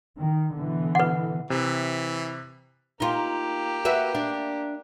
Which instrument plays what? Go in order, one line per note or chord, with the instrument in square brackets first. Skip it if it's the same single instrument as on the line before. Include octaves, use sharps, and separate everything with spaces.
[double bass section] D#3
B2 D3 E3
[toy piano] B4 F#5
[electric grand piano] C3 [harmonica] E3
[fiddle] A#3 G4 [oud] D#4 F4
[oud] F#4 B4 E5
D4